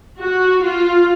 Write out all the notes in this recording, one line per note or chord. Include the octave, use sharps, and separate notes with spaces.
F#4
F4